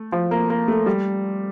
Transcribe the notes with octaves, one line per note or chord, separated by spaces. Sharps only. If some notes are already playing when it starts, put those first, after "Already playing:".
Already playing: A3
F3
A#3
A#3
A3
G3